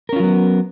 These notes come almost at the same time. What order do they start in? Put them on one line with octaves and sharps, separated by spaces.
A#4 C#4 F4 F#3 B3